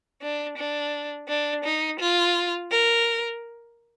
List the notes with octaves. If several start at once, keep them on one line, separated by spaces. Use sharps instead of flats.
D4
D4
D4
D#4
F4
A#4